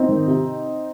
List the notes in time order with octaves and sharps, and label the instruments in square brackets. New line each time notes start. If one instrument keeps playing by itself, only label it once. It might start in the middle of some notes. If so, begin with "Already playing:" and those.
Already playing: [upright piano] C4 D#4
D#3
C3